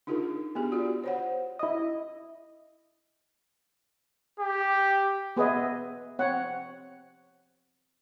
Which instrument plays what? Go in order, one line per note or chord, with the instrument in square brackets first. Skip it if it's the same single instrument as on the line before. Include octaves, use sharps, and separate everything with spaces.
[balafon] D4 D#4 F4 G#4 A#4
B3 D4 G4 G#4
F4 F#4 D5
C5 C#5 F#5
[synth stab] E4 D#5
[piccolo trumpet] G4
[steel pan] B3 G#4 B4 D#5 E5
C4 C#5 F#5